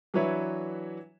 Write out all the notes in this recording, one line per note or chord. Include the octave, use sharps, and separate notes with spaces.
E3 F#3 D4 B4 C#5 E5